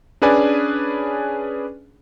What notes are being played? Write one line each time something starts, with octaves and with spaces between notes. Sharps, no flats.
C#4 D4 G#4 B4 D5 G#5